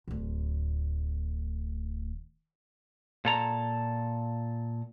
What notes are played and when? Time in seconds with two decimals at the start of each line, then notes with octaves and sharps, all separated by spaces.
0.08 D1 D2
3.25 A#2 A4 A#5